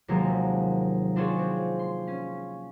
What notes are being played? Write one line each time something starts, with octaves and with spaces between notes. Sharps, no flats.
D#2 C3 F3 F#3 G#3 A#3
C4 D4 F4 G#4 C5 C#5
C4
C6
C#4